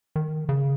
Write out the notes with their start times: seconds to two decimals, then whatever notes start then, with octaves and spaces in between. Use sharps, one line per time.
0.16 D#3
0.49 C#3